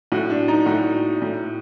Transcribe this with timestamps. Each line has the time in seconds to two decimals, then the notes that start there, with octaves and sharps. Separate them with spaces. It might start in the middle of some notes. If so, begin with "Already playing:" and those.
0.12 A2 F#4
0.30 D4
0.48 D#4
0.66 A2 F#4
1.22 A2